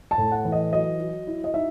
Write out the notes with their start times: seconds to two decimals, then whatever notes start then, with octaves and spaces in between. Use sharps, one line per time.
0.11 A5
0.18 A2
0.32 F#5
0.45 E3
0.52 D#5
0.73 F#3 D#5
0.99 F#3
1.27 E4
1.44 D#5
1.54 D#4 E5